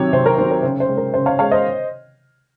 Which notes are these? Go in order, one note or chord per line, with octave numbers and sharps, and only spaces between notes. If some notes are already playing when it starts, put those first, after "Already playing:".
Already playing: C3 D#3 F#3 C#5
C3 C5
A#4
D#3 F#3 C5
A#4
C#3 C5
C5
G#3
A#4
C#3 C5
C#5 F5
G#3 C#5 F5
C5 D#5